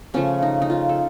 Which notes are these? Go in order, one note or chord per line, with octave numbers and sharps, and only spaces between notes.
C#3 F3 A3 C#4
D#4
D#4
F4
A4